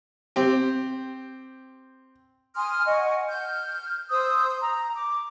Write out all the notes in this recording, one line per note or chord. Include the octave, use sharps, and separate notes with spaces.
C4 G4
G#5 C6 D#6 F6
D#5 F#5 G#5 C#6
F6 G6
C5 D#6 E6 G6
A#5
D6